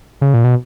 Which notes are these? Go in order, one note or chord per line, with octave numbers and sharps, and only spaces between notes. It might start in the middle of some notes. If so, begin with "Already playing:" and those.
C#3
A#2
B2